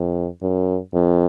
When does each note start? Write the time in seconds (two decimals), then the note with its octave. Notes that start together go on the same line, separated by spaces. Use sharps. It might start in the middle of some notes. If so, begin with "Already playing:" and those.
Already playing: F2
0.42 F#2
0.94 F2